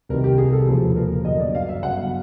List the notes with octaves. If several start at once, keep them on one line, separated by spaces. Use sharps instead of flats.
C2 C3 D#3 A#4
G4
G#4
A4
E1 D#2 C#3 F3
A#4
G1 F#2 D#3 D#5
D5
F5
E5
G1 F#2 C#3 F#5
F5